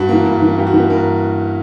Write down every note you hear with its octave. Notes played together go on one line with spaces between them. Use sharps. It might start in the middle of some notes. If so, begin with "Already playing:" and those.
Already playing: G2 F#4
E3 A#3
G2
E3 A#3
G2 G4
F#4
E3 A#3 G4
G2 A#4